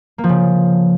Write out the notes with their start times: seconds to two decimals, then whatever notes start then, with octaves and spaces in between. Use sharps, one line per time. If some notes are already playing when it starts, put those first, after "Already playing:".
0.18 A#3
0.24 F3
0.29 C#3